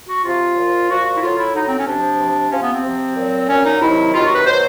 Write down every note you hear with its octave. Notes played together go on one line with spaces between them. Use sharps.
F#4
C3 F3 F4
A#2 F3
A#2 F3 F#4
F#4
E4
A2 F#3 F4
E4
A2 F#3 D#4
C4
C#4
C3 F3 D4
C3 F3
C3 F3 C#4
B3
C4
C3 F3
A#2 F#3
A#2 F#3 C#4
D#4
C3 D#3 F#3 E4
C3 D#3 F#3 F4
F#4
B4
B2 F#3 C5